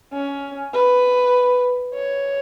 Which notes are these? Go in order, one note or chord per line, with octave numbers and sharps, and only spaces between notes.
C#4
B4
C#5